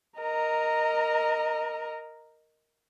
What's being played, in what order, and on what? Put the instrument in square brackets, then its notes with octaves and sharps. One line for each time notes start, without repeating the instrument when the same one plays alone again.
[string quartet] A#4 D#5 A#5